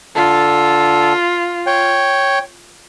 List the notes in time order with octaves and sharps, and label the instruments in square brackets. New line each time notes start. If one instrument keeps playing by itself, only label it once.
[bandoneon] D3 A4 [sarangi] F4
[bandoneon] C#5 G5